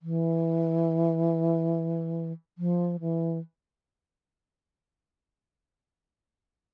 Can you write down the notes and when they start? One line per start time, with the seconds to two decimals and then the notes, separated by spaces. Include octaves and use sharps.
0.02 E3
2.58 F3
3.01 E3